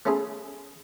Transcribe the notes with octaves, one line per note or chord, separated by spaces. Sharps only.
A3 C#4 E4 F4 G#4